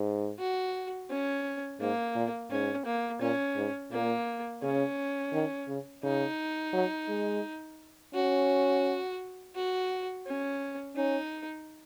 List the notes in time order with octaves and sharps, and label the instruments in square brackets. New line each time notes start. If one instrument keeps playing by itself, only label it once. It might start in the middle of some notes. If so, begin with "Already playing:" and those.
Already playing: [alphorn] G#2
[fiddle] F#4
C#4
[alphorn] G#2 [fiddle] A#3
[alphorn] A#2
[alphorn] G#2 [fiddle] C#4
[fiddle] A#3
[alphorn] A#2 [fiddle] C#4
[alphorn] G#2
[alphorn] A#2 [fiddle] A#3
[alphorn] C#3 [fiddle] C#4
[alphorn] D#3
C#3
[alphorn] C#3 [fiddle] D#4
[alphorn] F#3
G#3
[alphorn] C#4 [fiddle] F#4
[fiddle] F#4
C#4
[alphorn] C#4 [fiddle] D#4